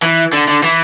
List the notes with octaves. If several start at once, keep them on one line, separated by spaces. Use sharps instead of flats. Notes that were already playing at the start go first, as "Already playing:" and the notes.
E3
D3
D3
E3